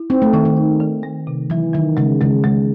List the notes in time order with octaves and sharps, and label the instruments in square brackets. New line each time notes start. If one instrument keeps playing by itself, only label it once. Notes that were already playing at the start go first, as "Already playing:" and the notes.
Already playing: [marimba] E4
[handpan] C4 [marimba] D#4
[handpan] A3
[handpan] D#3 [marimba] D#4
[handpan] D#3
[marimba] D#4
D#3
A3
C3
[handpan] E3 [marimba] F#3
[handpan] D#3 [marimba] F#3
[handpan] C#3 [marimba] G#3
[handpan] C#3 [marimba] G#3
[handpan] C#3 [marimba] G#3